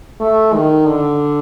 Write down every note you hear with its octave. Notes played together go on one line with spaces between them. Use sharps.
A3
D#3
D3